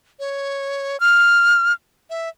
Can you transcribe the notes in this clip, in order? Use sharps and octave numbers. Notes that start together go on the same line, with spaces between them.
C#5
F6
E5